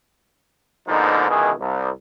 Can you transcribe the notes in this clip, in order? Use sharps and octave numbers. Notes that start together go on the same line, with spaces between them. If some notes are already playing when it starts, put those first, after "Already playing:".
G#2 B2 D3 F3 A#3 D#4
C#2 B2 D#3 E3 G#4
C2